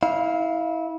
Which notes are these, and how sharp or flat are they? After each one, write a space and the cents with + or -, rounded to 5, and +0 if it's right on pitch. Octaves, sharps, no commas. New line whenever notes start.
E4 -25 F5 +0